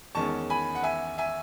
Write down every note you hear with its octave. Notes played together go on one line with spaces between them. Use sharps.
E2 D#3 G#3 C#4 A5 C#6
G#5 B5
F#5
E5 G#5
E5 G#5